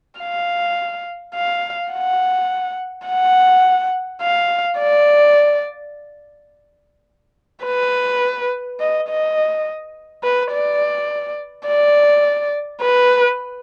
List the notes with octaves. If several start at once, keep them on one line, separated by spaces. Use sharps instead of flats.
F5
F5
F#5
F#5
F5
D5
B4
D#5
D#5
B4
D5
D5
B4